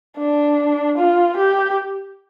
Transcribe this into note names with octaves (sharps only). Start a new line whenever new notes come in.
D4
F4
G4